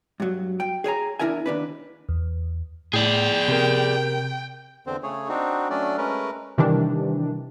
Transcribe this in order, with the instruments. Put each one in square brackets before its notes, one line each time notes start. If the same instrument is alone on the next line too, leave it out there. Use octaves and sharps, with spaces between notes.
[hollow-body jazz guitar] G2 F#3
G5
G#4 C#5 G#5 A#5
E2 D4 E4 A#4 E5 G#5
D#2 D4 B4
[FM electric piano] E2
[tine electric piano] A2 [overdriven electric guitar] G#4 D5 [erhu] G5
[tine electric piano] C3 A#4
[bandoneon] E2 D3 C4 C5
C#3 A3 G#4 C#5
C4 D4 D#4 F#4
F#3 A3 C#4 D4 D5
G#3 A3 C#4 A#4 B4
[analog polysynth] C3 D#3 E3 G3 D4